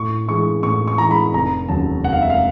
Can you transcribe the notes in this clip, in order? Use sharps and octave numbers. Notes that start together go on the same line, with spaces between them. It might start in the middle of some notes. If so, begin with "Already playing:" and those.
Already playing: A2 C#6
E3 G#3 C#6
A2 C#6
C#6
E3 G#3 A#5
B5
F1 A#5
D#2 C#3 F#3 A5
F1 F#5
F5
E5
F5